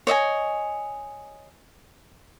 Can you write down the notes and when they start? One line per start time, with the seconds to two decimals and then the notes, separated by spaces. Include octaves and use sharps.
0.07 C#5 D#5 E5 G#5